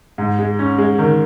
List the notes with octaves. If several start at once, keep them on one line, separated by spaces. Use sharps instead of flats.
G#2
G#3
C#4
G#3
D#3